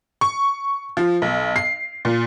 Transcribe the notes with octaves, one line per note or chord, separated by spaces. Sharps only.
C#6
F3
B1
C7
A#2